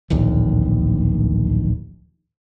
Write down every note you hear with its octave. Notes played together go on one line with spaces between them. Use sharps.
D1 A#1 D#2